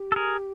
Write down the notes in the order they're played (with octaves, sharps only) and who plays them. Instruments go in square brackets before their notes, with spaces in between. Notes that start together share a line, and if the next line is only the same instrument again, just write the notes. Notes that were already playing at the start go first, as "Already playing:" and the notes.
Already playing: [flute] G4
[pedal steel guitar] A4
G#4 A#4